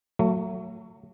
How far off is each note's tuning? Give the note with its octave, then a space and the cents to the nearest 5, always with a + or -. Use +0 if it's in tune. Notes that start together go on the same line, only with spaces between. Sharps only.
F#3 +0 A3 +30